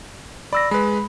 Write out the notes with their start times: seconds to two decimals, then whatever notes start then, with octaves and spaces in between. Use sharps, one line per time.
0.53 D5 B5 E6 A#6
0.71 G#3 B4 B5